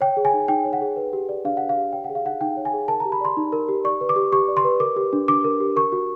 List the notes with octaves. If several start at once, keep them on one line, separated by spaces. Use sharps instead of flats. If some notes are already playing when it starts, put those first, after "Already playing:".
C#5 G5
G#4
G#5
D#4
D#4 G5
C#5
F#5
G#4
B4
G4
D5
D4 F5
B4 F#5
F5
G4
C#5 G5
F#5
G#4
F5
D#4 F#5
D#4 G5
C#5
G#5
G#4
A#4 A5
G4 A#5
B5
D5 C6
D#4
A#4
G4
D5 C#6
B4
D6
G4
G4 C#6
D5
C6
B4
A#4 D6
G4
D4
D4 D6
A#4
G4
A#4 C#6
F#4